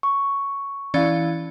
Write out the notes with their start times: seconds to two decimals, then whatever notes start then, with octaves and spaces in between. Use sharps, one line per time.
0.03 C#6
0.94 E3 C#4 E4 D5 F5 A6